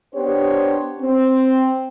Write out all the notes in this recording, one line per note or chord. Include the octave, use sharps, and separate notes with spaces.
B3 D4 G4 C5 C#5
C4